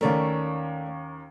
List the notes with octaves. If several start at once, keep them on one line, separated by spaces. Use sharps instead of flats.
D#2 A3 C#4 A#4 D5